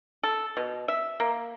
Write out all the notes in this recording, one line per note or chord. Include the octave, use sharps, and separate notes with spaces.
A4
B2
E5
A#3